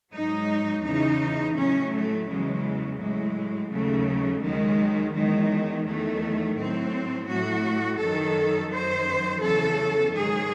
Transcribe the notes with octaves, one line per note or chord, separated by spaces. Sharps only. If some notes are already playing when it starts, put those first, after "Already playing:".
G#2 F#3 D#4
E2 C#3 E3 D#4
A2 F#3 C#4
A3
E2 C#3 F#3 G#3
A2 F#3 G#3
D#2 C#3 F#3 A3
D#2 D#3 F#3 G#3
E2 D#3 F#3 G#3
E2 D#3 F#3 A3
A2 F#3 C4
A2 F#3 F#4
F#2 D#3 F#3 A4
F#2 D#3 F#3 C5
E2 C#3 F#3 A4
G#2 D#3 F#3 G#4